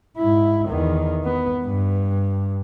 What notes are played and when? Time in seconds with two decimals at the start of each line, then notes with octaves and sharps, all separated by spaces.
0.17 G#2 E4
0.68 E2 D#3
1.24 B3
1.66 G2